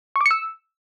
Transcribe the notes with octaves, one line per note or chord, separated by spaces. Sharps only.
C#6
D6
C#7
E6